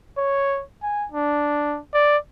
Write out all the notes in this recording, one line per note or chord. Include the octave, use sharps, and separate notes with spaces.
C#5
G#5
D4
D5